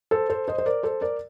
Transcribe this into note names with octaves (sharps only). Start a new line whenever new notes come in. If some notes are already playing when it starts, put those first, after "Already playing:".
A4 C5
A4 C5
C5 D#5
C5
A#4 D5
A4 C5
A#4 D5